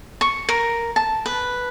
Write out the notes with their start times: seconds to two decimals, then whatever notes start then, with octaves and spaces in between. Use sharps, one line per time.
0.21 C#6
0.49 A#4
0.96 A5
1.26 B4